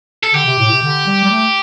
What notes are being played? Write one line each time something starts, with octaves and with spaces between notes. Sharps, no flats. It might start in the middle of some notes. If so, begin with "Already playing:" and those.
A4
D3 G4
C3
A2
C3
D3
G3
G3
A3